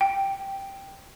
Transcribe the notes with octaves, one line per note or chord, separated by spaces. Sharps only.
G5